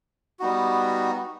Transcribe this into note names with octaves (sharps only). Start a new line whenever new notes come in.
G3 B3 D#4 F#4